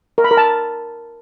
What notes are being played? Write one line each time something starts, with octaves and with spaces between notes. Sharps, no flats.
A#4
B5
A#4
A5